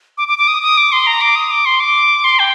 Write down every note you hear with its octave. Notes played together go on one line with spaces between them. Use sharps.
D6
D6
D6
D#6
D#6
D6
C6
A#5
D6
D#6
D6
C6
D6
C6
G5